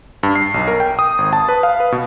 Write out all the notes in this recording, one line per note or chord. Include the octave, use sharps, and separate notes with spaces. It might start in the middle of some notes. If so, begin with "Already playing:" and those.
G2
C7
B1
A#4
G5
D#6
G#1
A5
B4
F5
B4
B2